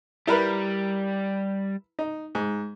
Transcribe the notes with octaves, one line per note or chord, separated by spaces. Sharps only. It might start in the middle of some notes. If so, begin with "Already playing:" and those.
G3 E4 A#4 B4
D#4
G#2